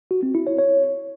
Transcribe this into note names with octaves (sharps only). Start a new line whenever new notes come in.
F#4
C4
E4
C#5
C#5